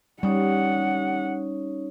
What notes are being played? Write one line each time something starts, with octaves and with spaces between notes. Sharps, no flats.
G3 C#4 D#4 C#5 F#5